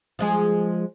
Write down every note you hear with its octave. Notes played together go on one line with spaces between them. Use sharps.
F3 G#3 G#4